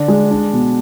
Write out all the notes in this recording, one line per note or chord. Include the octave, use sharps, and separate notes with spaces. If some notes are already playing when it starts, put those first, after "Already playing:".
Already playing: D3 D4
G#3
D4
B2